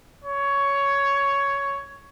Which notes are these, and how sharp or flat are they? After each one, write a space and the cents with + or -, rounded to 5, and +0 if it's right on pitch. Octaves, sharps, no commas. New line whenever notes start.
C#5 +10